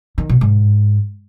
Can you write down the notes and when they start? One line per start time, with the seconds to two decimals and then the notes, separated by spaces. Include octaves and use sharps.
0.18 D#3
0.29 B2
0.41 G#2